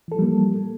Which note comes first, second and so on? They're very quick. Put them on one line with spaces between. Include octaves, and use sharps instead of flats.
E3 A4 F3 G3 A#3